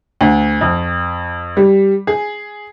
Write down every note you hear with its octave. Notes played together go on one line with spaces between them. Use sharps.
D2
F2
G3
G#4